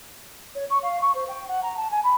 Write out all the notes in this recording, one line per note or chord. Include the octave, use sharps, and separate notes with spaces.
C#5
C#6
F5
C#6
C5
G5
F#5
A#5
A5
G#5
B5